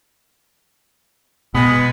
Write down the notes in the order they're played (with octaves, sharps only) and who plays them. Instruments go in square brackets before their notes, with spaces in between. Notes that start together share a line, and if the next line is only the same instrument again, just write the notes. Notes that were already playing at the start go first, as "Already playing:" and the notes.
[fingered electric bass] B2 [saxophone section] G#3 B3